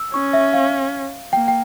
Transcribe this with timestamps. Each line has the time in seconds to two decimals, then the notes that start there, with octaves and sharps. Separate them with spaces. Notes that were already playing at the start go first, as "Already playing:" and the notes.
Already playing: E6
0.13 C#4 C#6
0.33 E5
0.54 F5
1.33 A#3 G5
1.48 G5